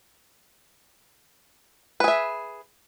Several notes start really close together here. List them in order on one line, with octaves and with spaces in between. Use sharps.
B4 G#4 E5